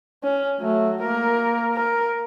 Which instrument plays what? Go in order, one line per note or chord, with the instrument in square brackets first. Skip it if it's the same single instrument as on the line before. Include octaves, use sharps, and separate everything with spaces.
[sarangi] C#4
[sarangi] F#3 [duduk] A3
[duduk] A#3 [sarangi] A#4
[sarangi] A#4